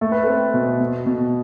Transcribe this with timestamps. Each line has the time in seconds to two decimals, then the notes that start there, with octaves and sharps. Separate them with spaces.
0.01 A3 A4
0.12 B4
0.24 C4 A4
0.54 B2
0.80 B2
1.06 B2